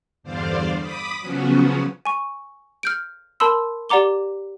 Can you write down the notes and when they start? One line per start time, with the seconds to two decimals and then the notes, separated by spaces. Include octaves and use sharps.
0.23 E2 G2 D3 C5 D5 F5
0.80 B5 D6 D#6 B6
1.21 C#3 F3 F#3 B3 C#4 F#4
2.05 G#5 C#6
2.83 F6 G6 D7
3.40 A#4 A5 B5 C6 E6
3.89 G4 D5 F#5 A#5 D6 G7